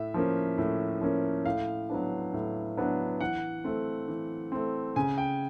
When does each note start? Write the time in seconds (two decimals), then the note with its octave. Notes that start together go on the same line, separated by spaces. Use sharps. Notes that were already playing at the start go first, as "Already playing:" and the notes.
Already playing: A2 E5
0.14 F3 A#3 C#4
0.58 A2
1.01 F3 A#3 C#4
1.46 A2 F5
1.89 F#3 B3 D4
2.33 A2
2.77 F#3 B3 D4
3.20 E3 F#5
3.64 A3 C4
4.08 E3
4.52 A3 C4
4.96 C#3 G#5
5.18 G5